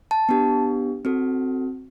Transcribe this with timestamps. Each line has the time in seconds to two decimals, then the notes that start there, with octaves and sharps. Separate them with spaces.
0.11 A5
0.29 B3 D4 G4
1.05 C4 F#4 A4